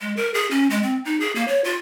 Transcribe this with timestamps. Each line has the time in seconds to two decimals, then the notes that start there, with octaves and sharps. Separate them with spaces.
0.01 G#3
0.17 A#4
0.34 G#4
0.51 C#4
0.70 G#3
0.83 C4
1.05 D#4
1.20 G#4
1.36 A#3
1.48 C#5
1.64 F4